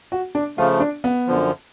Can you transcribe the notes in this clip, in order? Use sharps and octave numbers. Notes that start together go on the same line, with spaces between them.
F#4
D4
C#3 F3 A3 F4
D4
B3
F#2 D3 F3